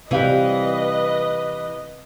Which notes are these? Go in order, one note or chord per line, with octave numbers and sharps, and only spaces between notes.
C3 E3 G3 C4 B4 D#5 F5